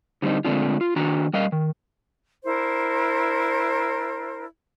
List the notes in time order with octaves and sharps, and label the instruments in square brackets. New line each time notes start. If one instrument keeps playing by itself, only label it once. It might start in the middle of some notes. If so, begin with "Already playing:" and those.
[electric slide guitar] D3 F#3 G3 C4 D#4
D3 G#3 A3 C4 D4 F4
F4
D#3 D4 F#4 A#5
G3 A#4 D#5 F5
D#3
[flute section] D4 E4 A#4 C5